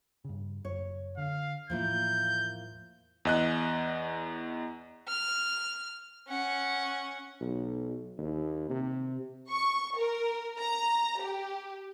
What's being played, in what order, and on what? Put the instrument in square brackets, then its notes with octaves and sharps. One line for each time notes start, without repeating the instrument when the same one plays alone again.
[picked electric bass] G2 C#3
[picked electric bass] F#1 F#2 [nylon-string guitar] C#5
[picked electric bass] D3 [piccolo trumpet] F5
[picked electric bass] E2 A2 [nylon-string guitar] F3 A#3 E4 [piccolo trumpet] G6
[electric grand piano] E2 D#5 F#6
[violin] F6
C#4 F#5
[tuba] B1
D#2
C3
[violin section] C#6
A#4
A#5
G4